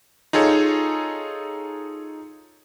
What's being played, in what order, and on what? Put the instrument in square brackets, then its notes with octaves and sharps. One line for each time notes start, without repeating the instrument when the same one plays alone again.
[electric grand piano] D#4 F4 G#4 A4 C#5